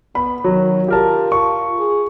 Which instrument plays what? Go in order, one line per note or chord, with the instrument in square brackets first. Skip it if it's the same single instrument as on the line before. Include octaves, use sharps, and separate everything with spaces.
[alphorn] B3 [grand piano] B5
[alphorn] D#3 [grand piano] F#3
[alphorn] F4 [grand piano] G4 A#4 A5
[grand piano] C#6
[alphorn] G#4